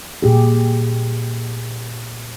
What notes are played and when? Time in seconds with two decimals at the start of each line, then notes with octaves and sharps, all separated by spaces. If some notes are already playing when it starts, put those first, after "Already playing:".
0.22 A#2 G4 G#4